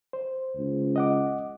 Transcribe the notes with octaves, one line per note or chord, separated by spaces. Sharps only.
C5
C#2
D#5 F#5 D6